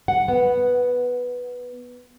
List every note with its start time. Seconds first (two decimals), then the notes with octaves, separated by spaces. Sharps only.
0.08 F#5
0.28 B3